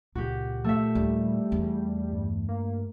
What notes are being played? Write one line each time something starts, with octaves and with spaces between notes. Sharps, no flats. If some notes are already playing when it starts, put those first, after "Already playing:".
C#2 A#2 F#4 G4
A3 E5
D#2 G3
E2
G2
A#3